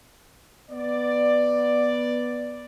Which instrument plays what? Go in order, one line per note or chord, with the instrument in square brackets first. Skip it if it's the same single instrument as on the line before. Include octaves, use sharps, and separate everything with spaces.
[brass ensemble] B3 D5